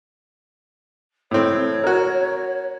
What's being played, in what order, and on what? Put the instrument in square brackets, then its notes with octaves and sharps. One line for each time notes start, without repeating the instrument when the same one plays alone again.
[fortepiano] A2 C4 [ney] C#5
[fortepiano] F#4 A#4